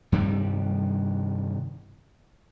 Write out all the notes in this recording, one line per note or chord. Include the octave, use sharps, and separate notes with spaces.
G2 C3 D#3 G3